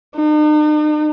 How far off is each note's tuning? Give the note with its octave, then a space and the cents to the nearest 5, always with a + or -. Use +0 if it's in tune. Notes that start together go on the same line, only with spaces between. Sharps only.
D#4 -45